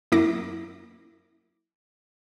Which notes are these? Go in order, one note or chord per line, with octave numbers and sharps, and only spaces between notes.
F#2 A#3 E4 D6 A#6